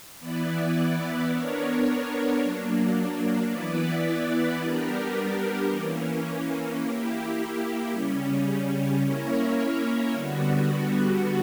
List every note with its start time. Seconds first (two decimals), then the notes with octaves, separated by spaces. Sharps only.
0.20 E3 B3 E4 B4 D5
1.30 B3 D4 A#4 C#5
2.40 F#3 A#3 D4
3.50 E3 B3 E4 B4 D5
4.60 G3 B3 D4 G4 A#4
5.70 E3 A#3 C#4
6.81 A#3 E4 G4
7.91 C#3 G3 C#4
9.01 A#3 C#4 E4 A#4 C#5
10.11 D3 G3 B3 F#4